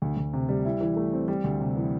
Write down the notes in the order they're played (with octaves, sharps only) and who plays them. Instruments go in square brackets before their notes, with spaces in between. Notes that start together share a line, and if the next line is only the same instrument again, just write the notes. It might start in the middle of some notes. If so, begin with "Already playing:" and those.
[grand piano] D2
D2
C3
G3
E4
E3
A3
C4
G3
D2
C3
E3